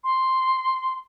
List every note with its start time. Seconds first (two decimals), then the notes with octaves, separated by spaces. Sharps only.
0.04 C6